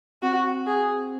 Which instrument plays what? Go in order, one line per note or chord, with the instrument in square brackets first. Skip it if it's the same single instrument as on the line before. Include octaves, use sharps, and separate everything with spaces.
[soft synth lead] C4 [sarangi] F#4
[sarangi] G#4